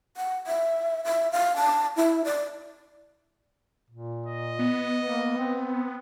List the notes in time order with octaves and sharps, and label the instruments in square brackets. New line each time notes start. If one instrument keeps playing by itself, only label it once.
[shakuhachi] F#5
E5
E5
F5
A5
E4
D5
[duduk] A#2
[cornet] D#5
[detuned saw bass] B3
[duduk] A#3
C4